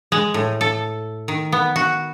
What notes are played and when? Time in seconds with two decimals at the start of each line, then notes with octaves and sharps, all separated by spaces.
0.12 G#3
0.34 A2
0.61 A4
1.28 D#3
1.52 B3
1.76 F#4